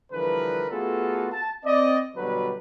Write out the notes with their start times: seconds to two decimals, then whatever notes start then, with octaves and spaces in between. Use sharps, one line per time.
0.13 D3 E3 F3 G3 A#4 B4
0.71 A3 B3 F4 F#4 G#4 A4
1.33 A5
1.65 C4 D5 D#5
2.17 B2 D3 F#3 G3 B4